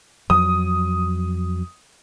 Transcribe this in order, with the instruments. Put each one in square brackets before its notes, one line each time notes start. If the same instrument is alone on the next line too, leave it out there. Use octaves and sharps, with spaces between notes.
[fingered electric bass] F2 F#3 [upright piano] D#6